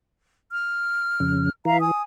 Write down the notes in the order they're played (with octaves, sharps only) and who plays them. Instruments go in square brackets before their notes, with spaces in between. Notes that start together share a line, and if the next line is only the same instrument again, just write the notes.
[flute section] F6
[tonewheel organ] F2 C#3
[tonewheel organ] E3 [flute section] E5 F5 A#5
[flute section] G#5 D#6